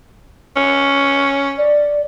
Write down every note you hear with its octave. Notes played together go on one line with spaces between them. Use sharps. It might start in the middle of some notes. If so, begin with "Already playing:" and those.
C#4
D5